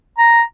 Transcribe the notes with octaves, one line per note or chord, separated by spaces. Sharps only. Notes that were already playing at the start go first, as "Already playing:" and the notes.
A#5